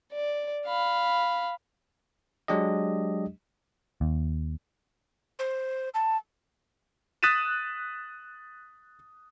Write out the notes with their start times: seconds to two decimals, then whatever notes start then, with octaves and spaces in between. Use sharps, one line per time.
0.12 D5
0.66 F5 B5
2.48 F#3 G#3 D4 G4 D#5
4.01 D#2
5.39 C5
5.94 A5
7.23 D#6 F#6 A6 B6 D#7 E7